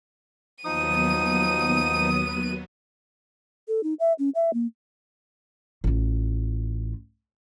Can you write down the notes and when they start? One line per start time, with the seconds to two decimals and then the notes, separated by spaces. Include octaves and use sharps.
0.65 D#2 F3 F#3 B3 D#4 D#6 D#7
3.68 A4
3.83 D#4
4.00 E5
4.19 C#4
4.35 E5
4.53 A#3
5.84 A1 F4